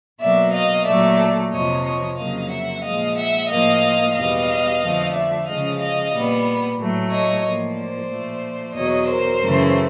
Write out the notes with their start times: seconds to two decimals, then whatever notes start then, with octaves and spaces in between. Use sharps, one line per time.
0.20 B2 F#3 A#3 D5 E5
0.53 D#5 F5
0.85 A#2 F#3 A3 D5 E5
1.51 F2 C3 F3 C#5 D#5
1.84 C#5 D#5
2.17 F2 C#3 F#3 A#3 D#5 F5
2.50 E5 F#5
2.83 A#2 F3 G#3 D#5 F5
3.16 E5 F#5
3.49 A2 F3 A#3 D#5 F5
4.14 E2 B2 G3 D#5 F5
4.80 F2 D3 F3 A3
5.13 D5 E5
5.46 C#3 F3 G#3 D#5 F5
5.79 D#5 F5
6.12 A#2 G3 B3
6.78 A2 F#3 A3
7.11 C#5 D#5
7.44 A2 F3 A#3
7.76 C5 D5
8.09 A#2 F3 A3
8.74 E2 B2 F#3 C#5 D#5
9.07 A#4 C5
9.40 F#2 C#3 E3 A3